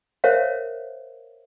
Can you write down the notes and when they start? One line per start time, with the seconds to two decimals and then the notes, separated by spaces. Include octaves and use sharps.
0.24 A#4 C5 C#5 E5 F5